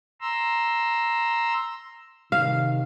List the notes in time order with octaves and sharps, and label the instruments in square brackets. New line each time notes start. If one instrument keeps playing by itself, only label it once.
[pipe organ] A#5 C6 E6
[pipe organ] C3 D#3 [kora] F5